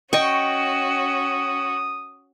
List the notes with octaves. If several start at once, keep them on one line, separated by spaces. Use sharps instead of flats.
C#4 F#4 D#5 G5 C#6 D#6